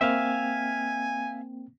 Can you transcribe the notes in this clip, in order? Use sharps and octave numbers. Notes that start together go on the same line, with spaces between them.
A#3 C4 E5 F5 G5 G#5